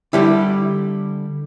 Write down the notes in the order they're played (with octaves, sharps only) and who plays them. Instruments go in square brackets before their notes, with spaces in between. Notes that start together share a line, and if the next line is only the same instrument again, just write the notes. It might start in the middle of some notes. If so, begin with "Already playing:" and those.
[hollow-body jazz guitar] D3 G3 G4 [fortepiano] E4